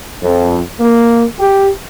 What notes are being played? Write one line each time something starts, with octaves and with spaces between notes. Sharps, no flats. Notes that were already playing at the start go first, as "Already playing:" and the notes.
F2
A#3
G4